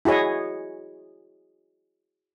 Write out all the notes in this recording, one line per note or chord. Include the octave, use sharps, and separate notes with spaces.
E4 F#4 G#4 C#5 D#5